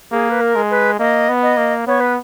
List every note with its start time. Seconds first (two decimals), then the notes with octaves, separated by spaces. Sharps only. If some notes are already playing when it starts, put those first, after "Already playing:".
0.12 A#3 G#4
0.30 B4
0.41 A#4
0.56 G#3
0.71 B4
0.99 A#3 D#5
1.29 B3
1.43 D#5
1.57 A#3
1.87 B3 C#5
2.00 B4